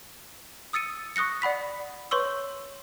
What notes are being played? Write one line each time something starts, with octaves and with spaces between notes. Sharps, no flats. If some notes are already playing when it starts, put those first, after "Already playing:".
D#6 E6 A6 C#7 D#7
C#6 D#6 F#6 A#6 C#7
D5 F#5 B5 B6
B4 C#5 C6 C#6 E6